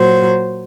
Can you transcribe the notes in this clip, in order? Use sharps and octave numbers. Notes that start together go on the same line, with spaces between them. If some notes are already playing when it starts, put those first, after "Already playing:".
Already playing: A#2 F#3 C5